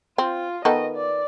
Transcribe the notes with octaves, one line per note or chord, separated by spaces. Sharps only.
C4 F4
D#3 B3 A4 D#5
D5